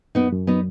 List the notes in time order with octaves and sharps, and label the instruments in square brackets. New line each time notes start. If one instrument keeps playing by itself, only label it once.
[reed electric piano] F#2 [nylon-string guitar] B3 D#4
[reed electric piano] F#2
[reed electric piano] F#3 [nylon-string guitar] B3 D#4